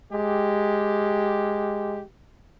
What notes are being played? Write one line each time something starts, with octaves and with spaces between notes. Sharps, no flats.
G#3 G4